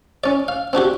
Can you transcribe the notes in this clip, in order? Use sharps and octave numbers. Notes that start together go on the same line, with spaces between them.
C#4 D5
F5
C4 D4 F#4 G4